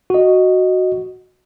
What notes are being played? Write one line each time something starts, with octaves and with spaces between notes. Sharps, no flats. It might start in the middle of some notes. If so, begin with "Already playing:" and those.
F#4 D#5